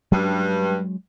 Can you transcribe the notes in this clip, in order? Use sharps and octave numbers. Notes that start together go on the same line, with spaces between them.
G2 F#3 G#3 C#4